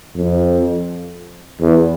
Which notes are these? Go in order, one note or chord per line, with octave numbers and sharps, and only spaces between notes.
F2
E2